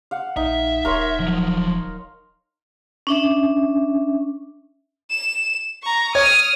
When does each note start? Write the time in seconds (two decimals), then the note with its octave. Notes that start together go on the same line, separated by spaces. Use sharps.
0.11 F5 F#5
0.37 A#1 D#4 E5
0.85 D#1 A#4 C#5 C6
1.20 F3 F#3
3.07 C#4 D4 E5
5.10 E7
5.83 A#5 C#6
6.15 C#5 D#6 F6